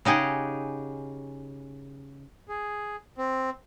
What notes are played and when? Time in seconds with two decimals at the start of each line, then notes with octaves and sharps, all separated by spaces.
0.05 C#3 D#4 G4 G#4 F#5
2.48 G#4
3.18 C4